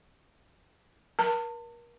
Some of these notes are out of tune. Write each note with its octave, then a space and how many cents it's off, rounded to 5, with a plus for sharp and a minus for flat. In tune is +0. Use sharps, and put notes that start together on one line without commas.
A#4 +35 A5 +40